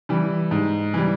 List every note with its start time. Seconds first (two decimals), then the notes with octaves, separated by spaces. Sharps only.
0.09 E3 G3
0.51 G#2
0.94 E3 G3